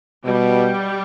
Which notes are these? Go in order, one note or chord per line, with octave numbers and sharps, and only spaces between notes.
B2 G3